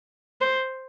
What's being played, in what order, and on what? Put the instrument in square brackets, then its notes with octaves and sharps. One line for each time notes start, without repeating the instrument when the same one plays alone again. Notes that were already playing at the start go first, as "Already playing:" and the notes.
[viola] C5